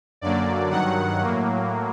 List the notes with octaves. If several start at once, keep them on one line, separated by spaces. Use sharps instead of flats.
F#2 D3 F#3 A#3 D5
G2 D#3 F#3 F#5
A2 F#3 A#3